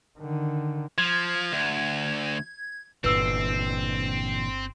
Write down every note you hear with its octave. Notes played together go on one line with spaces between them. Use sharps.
D3 D#3
F3 G#6
D2
G1 A#2 D3 E3 C4 B4 E6 C7